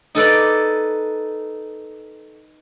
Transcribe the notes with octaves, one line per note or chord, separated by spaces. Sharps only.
D#4 A4 B4 D5